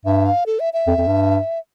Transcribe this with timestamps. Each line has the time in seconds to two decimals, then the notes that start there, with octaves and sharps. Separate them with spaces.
0.05 G2 E5
0.26 F5
0.46 A4
0.60 E5
0.73 E5
0.87 F2
0.98 F2
1.07 G2